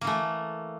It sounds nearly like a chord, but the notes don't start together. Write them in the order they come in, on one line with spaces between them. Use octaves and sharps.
A#3 E3 A3